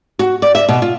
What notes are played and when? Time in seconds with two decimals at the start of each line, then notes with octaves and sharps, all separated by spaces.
0.19 F#4
0.42 D5
0.55 E5
0.69 B2
0.82 F4